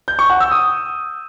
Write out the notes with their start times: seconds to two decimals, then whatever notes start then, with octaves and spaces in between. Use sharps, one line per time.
0.08 G6
0.19 C#6
0.30 F#5
0.40 E6
0.51 D#6